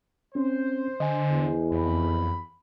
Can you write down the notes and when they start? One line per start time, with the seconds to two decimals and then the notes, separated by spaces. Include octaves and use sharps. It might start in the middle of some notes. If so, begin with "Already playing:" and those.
0.35 C4 C#4 C5
1.00 D3 D#5 G#5
1.30 E2
1.72 F2 B5